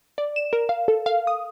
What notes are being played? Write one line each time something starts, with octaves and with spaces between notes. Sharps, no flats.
D5
E7
A#4
F5
A4
F5
D#6